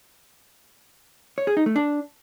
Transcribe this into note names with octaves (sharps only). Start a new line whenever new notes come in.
C#5
G#4
D#4
A3
D4